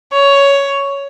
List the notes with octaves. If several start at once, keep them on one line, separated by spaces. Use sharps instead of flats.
C#5